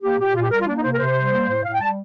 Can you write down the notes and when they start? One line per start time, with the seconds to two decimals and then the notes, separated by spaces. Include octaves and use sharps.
0.03 A#3 G4
0.19 A#2 G4
0.36 A#2 F4
0.43 G4
0.51 G3 A#4
0.60 F4
0.68 A#3 D4
0.77 D#4
0.83 C3 C5
0.93 A#4
1.00 C3 C5
1.17 G3
1.33 A#3
1.49 A2
1.64 A2 F5
1.73 G5
1.81 G3 A5